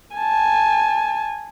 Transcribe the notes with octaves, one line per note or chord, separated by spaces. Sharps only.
G#5 A5